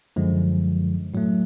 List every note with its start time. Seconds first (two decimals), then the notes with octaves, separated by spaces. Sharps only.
0.16 F#2 D3 F3 G#3
1.14 A2 F#3 A3